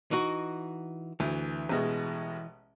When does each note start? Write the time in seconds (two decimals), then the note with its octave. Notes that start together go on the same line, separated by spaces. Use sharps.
0.11 E3 D#4 F#4
1.20 D2 E3
1.69 A1 B2 G#3